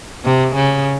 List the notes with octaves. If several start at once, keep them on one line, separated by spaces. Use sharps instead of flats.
C3
C#3